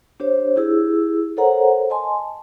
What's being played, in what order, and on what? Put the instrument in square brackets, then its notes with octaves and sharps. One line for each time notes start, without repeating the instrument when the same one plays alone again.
[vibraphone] D4 G4 C5 C#5
E4 G4 G#4 E6
A4 A#4 C5 C#5 F#5 A#5
D#5 G#5 A5 C6